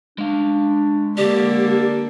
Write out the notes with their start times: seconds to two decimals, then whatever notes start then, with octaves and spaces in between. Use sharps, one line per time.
0.18 G#3 D4 F5
1.18 D3 A#3 G4 D5